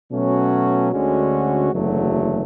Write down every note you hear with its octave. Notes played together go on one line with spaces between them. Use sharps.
B2 F#3 A3 C#4 F#4
D2 D3 G#3 C#4 F#4
F#1 E2 D3 F#3 A3